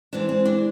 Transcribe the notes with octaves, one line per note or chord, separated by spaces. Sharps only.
E3 G#3 C4 D4
C4
D4